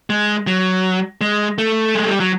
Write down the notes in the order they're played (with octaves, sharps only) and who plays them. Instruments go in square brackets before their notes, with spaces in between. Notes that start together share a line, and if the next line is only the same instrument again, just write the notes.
[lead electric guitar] G#3
F#3
G#3
A3
G#3
G3
F#3